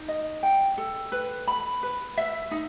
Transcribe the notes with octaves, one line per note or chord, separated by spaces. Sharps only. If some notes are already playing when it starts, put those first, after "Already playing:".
Already playing: D#4
D#5
G5
A4
B4
B5
B4
E5
D#4